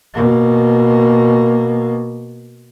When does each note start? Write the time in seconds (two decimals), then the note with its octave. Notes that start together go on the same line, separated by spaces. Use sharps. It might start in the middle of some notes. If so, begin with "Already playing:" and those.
0.15 B2 A#3